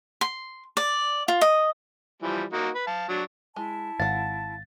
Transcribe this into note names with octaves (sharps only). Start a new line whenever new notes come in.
C6
D5
F4
D#5
E3 F3 G3
A#3 D#4 F#4
B4
F5 A5
F#3 D4
G#3 E4 A5
G#1 F5 F#5 A6